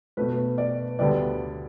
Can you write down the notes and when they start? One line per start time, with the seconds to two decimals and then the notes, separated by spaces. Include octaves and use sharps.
0.17 B2 A3 B4
0.58 D5
0.99 D2 D3 G3 B3 D5